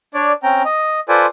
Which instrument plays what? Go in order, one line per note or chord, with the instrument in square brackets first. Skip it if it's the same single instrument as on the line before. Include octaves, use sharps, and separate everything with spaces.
[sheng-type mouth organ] D4 C#5 D5
C4 C#4 G5 A#5
D#5
F4 A4 B4 C5 D5 G#5